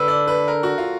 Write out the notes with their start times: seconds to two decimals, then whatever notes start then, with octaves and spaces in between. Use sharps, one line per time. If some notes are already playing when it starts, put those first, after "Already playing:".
Already playing: D3 B4
0.08 D5
0.28 B4
0.48 A#4
0.63 F#4
0.78 F4